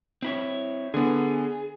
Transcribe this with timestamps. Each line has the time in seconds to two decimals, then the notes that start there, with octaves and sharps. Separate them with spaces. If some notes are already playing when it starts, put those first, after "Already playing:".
0.22 C4 E4 C#5
0.94 D3 B3 G#4